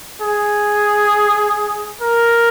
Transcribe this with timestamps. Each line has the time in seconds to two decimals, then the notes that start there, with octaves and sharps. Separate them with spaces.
0.22 G#4
2.01 A#4